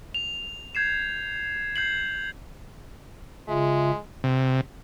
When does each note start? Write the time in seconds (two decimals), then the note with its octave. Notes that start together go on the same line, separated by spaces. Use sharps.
0.15 F7
0.75 G6 G#6 C7 E7
1.76 G6 C7 F#7
3.48 C#3 G#3 F4 E5
4.24 C3